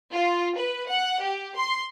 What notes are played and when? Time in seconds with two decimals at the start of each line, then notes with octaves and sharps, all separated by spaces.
0.12 F4
0.57 B4
0.89 F#5
1.23 G4
1.57 C6